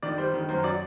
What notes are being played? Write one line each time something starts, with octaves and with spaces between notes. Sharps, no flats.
D#3 D5
G3 C5
D#3
F#2 C5
F#3 D5